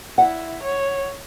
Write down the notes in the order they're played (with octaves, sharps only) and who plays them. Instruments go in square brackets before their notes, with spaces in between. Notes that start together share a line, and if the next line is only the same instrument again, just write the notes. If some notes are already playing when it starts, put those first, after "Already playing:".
[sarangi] E4 [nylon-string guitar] F#5
[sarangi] C#5